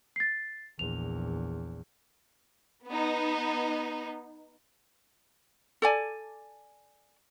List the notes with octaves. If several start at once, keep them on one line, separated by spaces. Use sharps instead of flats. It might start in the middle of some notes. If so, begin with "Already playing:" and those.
A6 C7
A#1 E2 F7
B3 D#4
A4 D5 G#5